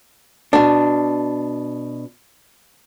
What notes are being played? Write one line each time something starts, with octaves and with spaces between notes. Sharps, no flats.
B2 D4